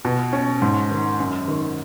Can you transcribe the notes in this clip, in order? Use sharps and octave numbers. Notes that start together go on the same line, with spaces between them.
B2
C#4
G#2
D#3
F#2
D#3